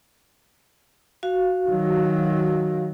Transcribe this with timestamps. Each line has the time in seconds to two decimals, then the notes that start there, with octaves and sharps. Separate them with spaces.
1.23 F#4 F5
1.69 D#3 F#3